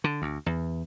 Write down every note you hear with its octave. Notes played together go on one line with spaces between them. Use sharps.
D3
D2
E2